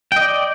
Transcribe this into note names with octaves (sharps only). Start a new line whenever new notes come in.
D5 D#5 G5